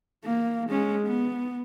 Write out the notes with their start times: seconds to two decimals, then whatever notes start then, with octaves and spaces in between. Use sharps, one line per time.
0.25 A#3
0.70 G#3 C#4
1.07 B3